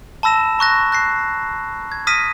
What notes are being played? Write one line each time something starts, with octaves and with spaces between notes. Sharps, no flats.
A5 B5 E6 A#6 E7
A#5 C#6 F#6 A#6
F#6 A#6 C7
G#6
D#6 F6 A#6 B6 D#7